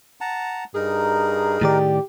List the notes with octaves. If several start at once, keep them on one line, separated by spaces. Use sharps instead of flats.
F#5 A5 A#5
G2 D#4 G#4 A#4
A2 D#3 G4 D5